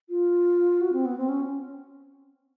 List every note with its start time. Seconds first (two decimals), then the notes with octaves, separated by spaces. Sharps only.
0.09 F4
0.81 F#4
0.93 C4
1.05 B3
1.17 C4
1.29 C#4